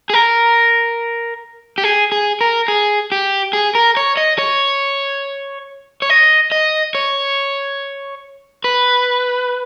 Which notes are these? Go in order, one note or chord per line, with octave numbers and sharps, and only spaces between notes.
G#4
A#4
G4
G#4
G#4
A#4
G#4
G4
G#4
A#4
C#5
D#5
C#5
C#5
D#5
D#5
C#5
B4